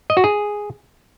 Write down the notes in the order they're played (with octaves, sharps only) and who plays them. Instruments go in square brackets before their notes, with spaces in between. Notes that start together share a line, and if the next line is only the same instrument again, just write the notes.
[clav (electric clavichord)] D#5
F#4
G#4